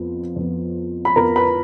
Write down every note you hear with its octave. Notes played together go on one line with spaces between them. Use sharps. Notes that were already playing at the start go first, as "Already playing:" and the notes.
Already playing: F2 F3 B3
F2 F3 B3
B5
F2 F3 B3 A#4 A#5
B4 B5